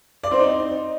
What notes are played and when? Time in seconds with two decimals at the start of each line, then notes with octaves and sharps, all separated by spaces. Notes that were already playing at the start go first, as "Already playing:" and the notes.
0.24 D5
0.31 C4
0.39 D#4